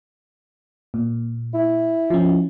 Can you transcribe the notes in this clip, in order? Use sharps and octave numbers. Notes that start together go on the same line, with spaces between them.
A#2
E4
F3 C#4